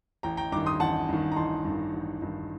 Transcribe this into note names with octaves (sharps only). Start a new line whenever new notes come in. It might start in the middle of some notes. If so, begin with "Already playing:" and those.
A1 G5 A#5
G5 A#5
G2 D#3 A#5 D6
C6 D#6
A1 F#5 A5
G2 D#3
A#5
A1 A5 C6
G2 D#3
A1
G2 D#3